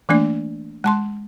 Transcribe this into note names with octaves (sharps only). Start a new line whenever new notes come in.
E3 A3 A#3 D4 D5
G#3 A5 C6